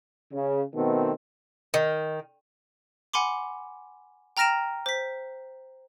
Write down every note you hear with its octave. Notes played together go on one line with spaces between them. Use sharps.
C#3
B2 D#3 A3 B3 C4
D#3
F#5 G#5 B5 C6 D6
G5 A#5 F6 A#6 D7 E7
C5 B6